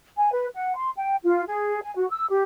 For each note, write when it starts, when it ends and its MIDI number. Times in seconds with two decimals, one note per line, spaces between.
0.17 0.31 80
0.32 0.46 71
0.54 0.74 78
0.75 0.90 84
0.96 1.14 79
1.23 1.43 65
1.47 1.79 68
1.82 1.93 80
1.96 2.06 66
2.10 2.26 88
2.29 2.43 67